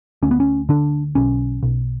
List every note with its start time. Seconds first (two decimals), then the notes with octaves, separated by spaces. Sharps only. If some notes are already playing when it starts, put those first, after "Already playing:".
0.23 D2 C#4
0.31 B3
0.40 C#4
0.69 D3 D4
1.15 B1 C#4
1.63 B1